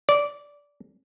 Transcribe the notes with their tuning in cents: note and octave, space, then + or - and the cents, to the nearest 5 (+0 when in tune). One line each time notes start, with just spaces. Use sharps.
D5 -15